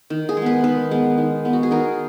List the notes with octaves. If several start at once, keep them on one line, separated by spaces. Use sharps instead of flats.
D#3
G#4
G#3
B3 B4
D#3 B4
G#3 B3
D#3
G#3 B3
F#4
G#4
D#3 A#4